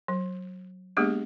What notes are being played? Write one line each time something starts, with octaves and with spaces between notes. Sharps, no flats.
F#3
G#3 A#3 B3 D4 G4 G#4